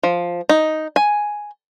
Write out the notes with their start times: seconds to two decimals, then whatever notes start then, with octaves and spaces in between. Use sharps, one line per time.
0.03 F3
0.49 D#4
0.96 G#5